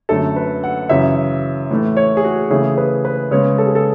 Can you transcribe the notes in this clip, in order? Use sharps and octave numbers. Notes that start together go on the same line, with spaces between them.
F#2 D3 A3 A4
B4
F#5
F#2 C#3 E3 E5
A2 E3 A3
C#5
G#4
F#4
C#3 E3 A3 G#4
B4
B4
C#3 G#3 B3 C#5
A4
G#4
A4